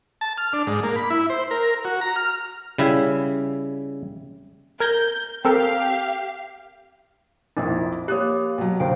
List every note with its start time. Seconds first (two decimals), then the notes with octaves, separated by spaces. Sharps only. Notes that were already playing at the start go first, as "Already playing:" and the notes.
0.21 A5
0.38 F6
0.53 D4
0.67 G#2
0.83 A#3
0.96 B5
1.10 E4
1.30 C5
1.51 A#4
1.85 F#4
2.01 A#5
2.16 F6
2.78 C#3 G3 E4 E5 F5
4.80 A#4 G6 G#6 A#6
5.45 C4 G4 A4 A#4 F5
7.57 A#1 F2 E4 A6
8.08 A#3 G4 C#5 D#6 F#6
8.58 B2 F#3
8.80 D2 C5 F5 G5